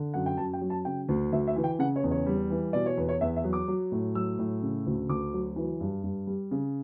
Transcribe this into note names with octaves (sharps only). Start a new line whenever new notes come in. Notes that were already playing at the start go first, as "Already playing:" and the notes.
Already playing: D3
F#2 F#5
G5
F#2 A5
G5
F#3
A5
C#3 G5
D2
D2 E5
E5
E3
G5
C#3 F#5
C#5
E2
C#5
G3
E3
B2 D5
C#5
E2 B4
C#5
E2 E5
E5
F#3
D6
F#3
A2
F#3 E6
A2
C#3
D2
D2 D6
F#3
E3
G2
G2
G3
C#3